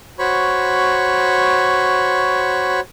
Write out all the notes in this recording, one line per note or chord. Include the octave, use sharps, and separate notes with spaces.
F#4 C5 C#5 B5 C#6